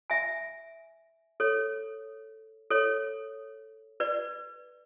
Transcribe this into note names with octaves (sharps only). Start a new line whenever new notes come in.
E5 G#5
A4 C#5
A4 C#5
B4 D5